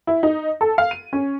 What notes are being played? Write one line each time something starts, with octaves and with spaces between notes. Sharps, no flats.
E4
D#4
A4
F5
D#7
C#4